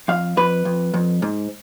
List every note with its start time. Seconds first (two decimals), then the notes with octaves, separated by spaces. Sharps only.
0.08 F2 F5
0.37 F2 B4
0.65 F2
0.94 F2
1.22 G#2